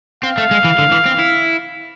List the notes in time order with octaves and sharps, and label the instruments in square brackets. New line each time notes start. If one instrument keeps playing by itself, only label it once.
[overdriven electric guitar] C4 [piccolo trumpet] F5
[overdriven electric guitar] A3
G#3
E3
D3
E3
C4
E4